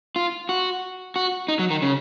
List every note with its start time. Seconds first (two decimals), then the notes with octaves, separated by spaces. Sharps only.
0.16 F4
0.49 F#4
1.16 F#4
1.48 D#4
1.59 F#3
1.70 D#3
1.82 C#3